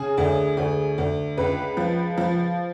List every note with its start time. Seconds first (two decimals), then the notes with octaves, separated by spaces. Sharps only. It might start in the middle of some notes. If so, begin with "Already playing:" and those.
Already playing: C#3 G#4
0.18 D2
0.57 D2
0.98 D2
1.37 C#2 B4
1.77 F3
2.18 F3